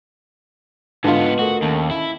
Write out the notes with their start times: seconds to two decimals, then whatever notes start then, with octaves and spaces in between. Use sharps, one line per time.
1.04 G#2 D3 B3 F4 B4 D#5 A5
1.39 A3 F#4 A4 A#4
1.62 D#2 C#4 A5
1.91 E4